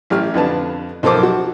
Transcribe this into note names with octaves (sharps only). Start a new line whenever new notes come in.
A1 G4 F6
F2 D3 B4 A5
B1 F3 A4 A#4 C5 D6
F#4